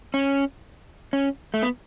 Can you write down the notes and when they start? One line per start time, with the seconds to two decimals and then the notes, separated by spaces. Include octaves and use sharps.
0.14 C#4
1.13 C#4
1.54 A3
1.63 B3